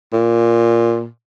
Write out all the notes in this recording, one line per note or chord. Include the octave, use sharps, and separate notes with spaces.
A#2